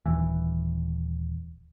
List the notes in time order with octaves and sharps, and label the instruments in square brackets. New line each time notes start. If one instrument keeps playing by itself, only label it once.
[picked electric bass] D#1 E3